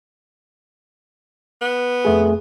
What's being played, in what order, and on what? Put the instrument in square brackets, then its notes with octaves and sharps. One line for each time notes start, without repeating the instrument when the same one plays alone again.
[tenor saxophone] B3
[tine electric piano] F2 A3 G#4